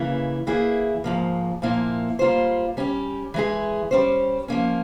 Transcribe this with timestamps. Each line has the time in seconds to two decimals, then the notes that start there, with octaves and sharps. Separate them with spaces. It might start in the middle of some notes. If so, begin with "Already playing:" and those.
Already playing: C#3 E3 A#3 E4
0.47 E3 A#3 E4 G#4
1.04 G#2 F3 A#3
1.62 A#2 F3 A#3 E4 A#4
2.19 G3 A#3 F4 C5
2.77 G3 C#4 G4
3.34 E3 G#3 E4 G#4
3.91 G3 C#4 G4 C5
4.48 F3 A#3 C#4